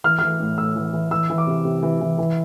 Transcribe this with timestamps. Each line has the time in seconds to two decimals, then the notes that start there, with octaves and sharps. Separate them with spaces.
0.04 E3 F6
0.19 E3 F6
0.40 A2
0.58 A2 E6
0.76 E3
0.94 E3
1.11 E3 E6
1.30 E3
1.38 D6
1.47 C3
1.65 C3
1.83 E3
2.01 E3
2.18 E3